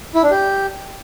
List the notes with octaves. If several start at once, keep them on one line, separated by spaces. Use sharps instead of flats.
E4
D4
G4